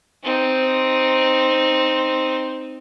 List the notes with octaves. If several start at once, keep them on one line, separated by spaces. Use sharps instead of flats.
C4 D#4